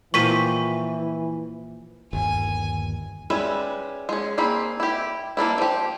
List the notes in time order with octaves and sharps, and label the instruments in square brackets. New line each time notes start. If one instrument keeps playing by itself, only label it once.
[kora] A#2 F3 G4 [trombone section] E3 [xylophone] C#6 B6 D#7
[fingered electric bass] G1 D#2 [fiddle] G#5
[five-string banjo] G3 G#3 C#4 B4 E5
G#3 C#4
A#3 C4 G#4 B5
E4 G4
G3 A#3 D4 E4
F3 G4